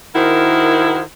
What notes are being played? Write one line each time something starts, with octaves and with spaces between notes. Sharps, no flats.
D#3 E4 F#4 G#4 A#4 C5